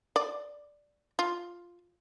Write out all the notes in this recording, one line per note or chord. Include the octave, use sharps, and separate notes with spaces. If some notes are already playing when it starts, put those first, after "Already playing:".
D5
F4